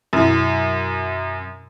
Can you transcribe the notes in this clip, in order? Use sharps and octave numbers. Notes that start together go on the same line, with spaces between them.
F#2 B2 F#3 E4